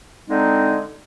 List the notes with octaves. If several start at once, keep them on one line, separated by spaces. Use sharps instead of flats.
D3 G#3 C4 D#4